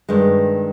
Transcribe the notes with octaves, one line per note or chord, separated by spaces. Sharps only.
G2 D#3 G#3